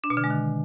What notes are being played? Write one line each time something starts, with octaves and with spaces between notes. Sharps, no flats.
D4
B2
D3
G#3
D#3